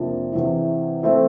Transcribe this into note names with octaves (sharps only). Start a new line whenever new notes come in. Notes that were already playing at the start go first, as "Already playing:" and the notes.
Already playing: F2 C3 F3 A#3 D4
E2 C3 E3
E3 A3 C4 E4